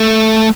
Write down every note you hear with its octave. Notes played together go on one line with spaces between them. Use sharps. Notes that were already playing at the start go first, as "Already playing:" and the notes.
Already playing: A3